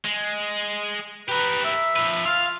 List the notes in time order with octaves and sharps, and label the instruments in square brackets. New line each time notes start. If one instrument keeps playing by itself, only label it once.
[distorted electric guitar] G#3
[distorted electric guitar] G4 A#4 [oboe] B4
[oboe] E5
[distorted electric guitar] F3 B4
[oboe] F4 [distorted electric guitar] F5